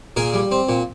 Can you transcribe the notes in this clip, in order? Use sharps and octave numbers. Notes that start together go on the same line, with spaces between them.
A#2 G#4 A#4
G3
C4
A#2